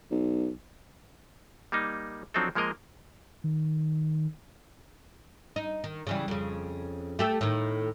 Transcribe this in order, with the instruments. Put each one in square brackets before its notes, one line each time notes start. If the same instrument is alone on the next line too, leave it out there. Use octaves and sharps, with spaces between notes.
[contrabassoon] B1
[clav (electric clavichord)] G3 A#3 D#4
F3 F#3 C4 D4 D#4 A4
F3 G#3 A#3 A#4 D#5
[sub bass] D#3
[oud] D#4
D#3
C#3 E3 G3
F2 C#3
A3 G4 A4
A2 D#3